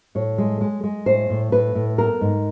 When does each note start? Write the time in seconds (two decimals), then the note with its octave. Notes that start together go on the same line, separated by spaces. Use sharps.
0.15 A2 C#5
0.38 G#3
0.61 G#3
0.83 G#3
1.06 A2 C5
1.30 A2
1.52 A2 B4
1.75 A2
1.98 B3 A#4
2.21 G#2